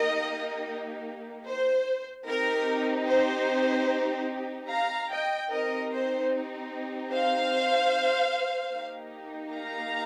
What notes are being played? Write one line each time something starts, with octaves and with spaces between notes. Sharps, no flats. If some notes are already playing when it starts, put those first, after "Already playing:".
Already playing: A#3 D#4 G4 A#4 D#5
C5
C4 D#4 G4 A#4
C5
F5 A#5
D#5 G5
C4 D#4 G4 A#4 D#5
C5
C5 F5
A#3 D#4 G4
F5 A#5